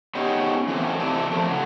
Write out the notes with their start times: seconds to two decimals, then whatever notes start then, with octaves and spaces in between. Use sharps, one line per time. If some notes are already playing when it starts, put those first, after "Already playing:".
0.15 B3 C#4 D#4 G4 G#4
0.68 E3 F#3 A3 A#3 C4
0.99 C3 C4 E4 D5 A5
1.30 F3 A3 A#4
1.47 A2 C#3 F#3